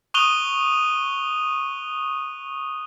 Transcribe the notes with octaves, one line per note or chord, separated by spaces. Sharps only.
C#6 D#6 F#6 D#7 F7 G7